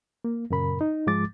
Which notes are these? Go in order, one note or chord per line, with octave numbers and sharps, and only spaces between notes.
A#3
F#2 A#2 C#3 A#4 B5
D#4
G#2 F3 G#3 D6 A6